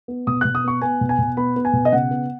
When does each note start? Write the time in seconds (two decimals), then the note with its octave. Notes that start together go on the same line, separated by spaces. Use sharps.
0.08 B3
0.27 B2 D#6
0.41 B2 F#6
0.55 D#6
0.64 B3 C#6
0.82 B3 G#5
1.01 B2
1.09 G#5
1.19 B2
1.37 B3 B5
1.56 B3
1.65 G#5
1.73 B2
1.85 D#5
1.92 C#3 F#5
2.11 B3